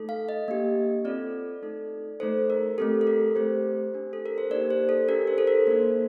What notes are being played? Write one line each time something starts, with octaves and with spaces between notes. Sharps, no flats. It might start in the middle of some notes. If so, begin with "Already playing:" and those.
Already playing: A3 D#4 A4
F5
D#5
A#3 D4 G4
C4 F4 A4 D5
A3 C4 D#4 A4
A3 D#4 A4 C5
A#4
A3 C4 G4 A4
A4
A#4
A3 C4 G4 C5
D4 G4
A4
A#4
C5
A#3 D#4 G4 D5
C5
A4
D4 G4 A#4
C5
A4
A#4
A#3 D#4 A4 C5